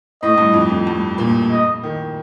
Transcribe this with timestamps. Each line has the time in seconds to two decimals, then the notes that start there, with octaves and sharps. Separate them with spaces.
0.22 A2 D#5
0.34 A2
0.38 G2
0.54 F2
0.70 F2
0.87 G2
1.18 A#2
1.50 D#5
1.83 D#3